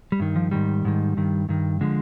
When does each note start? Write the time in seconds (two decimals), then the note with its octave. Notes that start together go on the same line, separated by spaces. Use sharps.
0.12 G3
0.20 G2 D#3
0.36 F3
0.51 G#2 D#3 G3
0.85 G#2 D#3
1.17 G2 D#3
1.49 G2 D#3
1.81 D3 F3 G#3